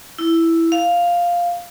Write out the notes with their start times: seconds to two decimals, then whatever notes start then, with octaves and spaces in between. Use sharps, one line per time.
0.19 E4
0.72 F5